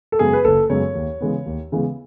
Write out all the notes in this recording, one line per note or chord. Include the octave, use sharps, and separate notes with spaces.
A4
F#2 C#3 G#3 B3 G#4
B4
F#1 A4
F#2 C#3 G#3 B3 C#5
D#2
C#3 E3 G#3 B3
D#2
C#3 E3 G#3 B3